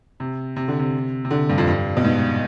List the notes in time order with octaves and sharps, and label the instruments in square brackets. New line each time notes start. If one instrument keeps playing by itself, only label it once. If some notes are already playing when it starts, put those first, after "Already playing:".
[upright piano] C3
C3
D3
C3
C3
D3
G2
F2
G2
B2
G#2